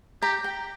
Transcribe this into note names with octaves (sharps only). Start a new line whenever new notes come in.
G4 A#5
G5